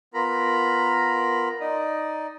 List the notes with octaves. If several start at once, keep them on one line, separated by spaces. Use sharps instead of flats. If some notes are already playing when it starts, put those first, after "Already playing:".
B3 F4 A#4 A#5 B5
D#4 D5 D#5